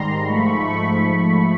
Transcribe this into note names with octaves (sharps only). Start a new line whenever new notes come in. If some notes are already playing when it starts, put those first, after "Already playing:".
Already playing: G#2 D#3 G3 A#5 C6
G#2 F3 A3 B5 C#6